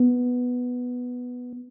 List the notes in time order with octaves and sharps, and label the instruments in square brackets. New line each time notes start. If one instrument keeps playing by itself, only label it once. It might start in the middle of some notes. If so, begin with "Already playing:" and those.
Already playing: [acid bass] B3